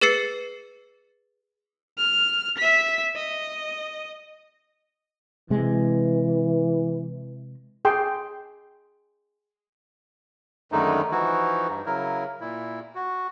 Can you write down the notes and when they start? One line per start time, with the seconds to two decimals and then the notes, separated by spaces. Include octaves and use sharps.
0.01 G#4 B4 E6 A6 C7 C#7
1.98 F6
2.58 E5 B6
3.16 D#5
5.50 C3 E3 G#3
7.85 G#4 G5 C6
10.72 F#2 D3 D#3 G#3 A3 D#4
11.11 E3 F3 D#4 E4 F#4
11.69 G2
11.86 C#3 F#3 E4 A#4
12.40 A#2 E4
12.95 F#4